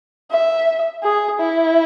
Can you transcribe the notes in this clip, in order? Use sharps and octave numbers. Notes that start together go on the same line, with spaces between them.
E5
G#4
E4